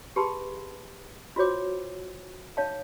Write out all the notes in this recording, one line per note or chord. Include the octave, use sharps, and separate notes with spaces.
G4 G#4 B4 A5 B5 C6
F4 F#4 C5 C#5 D6
D#4 C#5 F5 A5